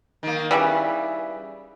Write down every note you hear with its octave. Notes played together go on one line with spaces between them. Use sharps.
D#3 A#3
C#3 E3 G3 E5